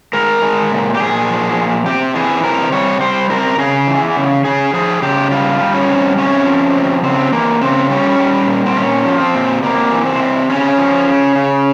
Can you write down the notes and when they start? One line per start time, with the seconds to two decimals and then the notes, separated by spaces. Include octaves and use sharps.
0.13 G#3 A#4
0.42 G#3
0.71 A#2
0.94 G4
1.00 A#2 G#4
1.29 F3
1.57 A#2
1.86 C3 G4
2.15 E3 G#4
2.43 C3 A#4
2.72 G3 C#5
3.01 G3 C5
3.30 C3 A#4
3.58 C#3 G#4
3.88 E3
4.16 C#3
4.45 C#3 G#4
4.74 F3 G#4
5.02 C#3 G4
5.31 G3 F4
5.61 G3
5.74 C#4
5.88 C3
6.17 C3 C#4
6.46 F3
6.75 C3
7.04 C#3 C4
7.32 E3 A#3
7.61 C#3 C4
7.90 G3 C#4
8.19 G3
8.47 A#2
8.66 C4
8.76 A#2 C#4
9.06 F3
9.20 C4
9.34 A#2
9.63 C3 A#3
9.92 E3
10.06 C4
10.20 C3
10.50 C#3 C#4
10.78 F3
11.07 C#3
11.35 C#3